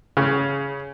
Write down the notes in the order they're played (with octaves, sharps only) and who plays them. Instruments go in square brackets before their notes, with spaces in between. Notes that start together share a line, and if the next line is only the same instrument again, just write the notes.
[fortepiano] C#3